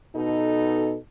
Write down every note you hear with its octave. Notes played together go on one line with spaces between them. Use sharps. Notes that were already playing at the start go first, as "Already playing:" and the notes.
B2 D#4 A4